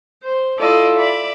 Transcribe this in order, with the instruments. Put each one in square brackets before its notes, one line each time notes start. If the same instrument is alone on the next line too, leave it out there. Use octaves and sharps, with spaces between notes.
[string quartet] C5
E4 F4 A4 D5 D#5
D5 E5 B5